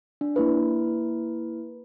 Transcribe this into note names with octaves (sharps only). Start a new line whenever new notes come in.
D4
A#3 E4 B4